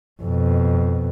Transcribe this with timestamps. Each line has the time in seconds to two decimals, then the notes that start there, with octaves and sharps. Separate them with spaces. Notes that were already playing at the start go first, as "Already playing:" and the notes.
0.23 F2 B2